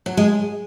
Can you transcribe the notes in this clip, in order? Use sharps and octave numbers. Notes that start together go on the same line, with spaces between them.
F#3
G#3